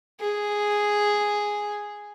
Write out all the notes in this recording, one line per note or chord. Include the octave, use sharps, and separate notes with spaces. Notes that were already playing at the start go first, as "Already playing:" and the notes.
G#4